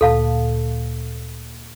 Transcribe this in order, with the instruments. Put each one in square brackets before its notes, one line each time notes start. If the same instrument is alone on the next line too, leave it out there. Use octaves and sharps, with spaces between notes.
[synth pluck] D2 A#2 [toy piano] A4 F5 A5